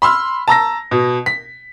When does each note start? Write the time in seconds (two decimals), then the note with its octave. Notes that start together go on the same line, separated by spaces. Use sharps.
0.02 B5 C6 E6 F6
0.48 A5 A#5 E6 A#6
0.91 B2
1.26 B6